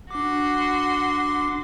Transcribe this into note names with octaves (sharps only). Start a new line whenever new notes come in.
D4 F#4 C6 D6